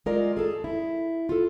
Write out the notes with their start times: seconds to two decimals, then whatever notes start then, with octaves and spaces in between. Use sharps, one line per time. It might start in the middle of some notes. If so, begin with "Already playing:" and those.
0.06 G#3 F4 A#4 D5
0.37 G#4 A4 A5
0.64 E4
1.29 F4 A4